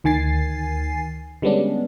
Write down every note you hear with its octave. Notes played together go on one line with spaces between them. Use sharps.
D2 D#3 G#5 A6 C7
D3 G3 G#3 B3 C#4 D4